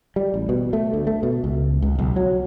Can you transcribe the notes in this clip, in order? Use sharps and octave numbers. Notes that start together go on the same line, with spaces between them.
G3
A1
B2
A3
D2
A3
B2
C#2
C#2
B1
F#3